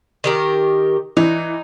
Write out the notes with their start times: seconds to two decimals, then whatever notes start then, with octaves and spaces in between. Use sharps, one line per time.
0.24 D#3 G4 A#4
1.17 E3 D#4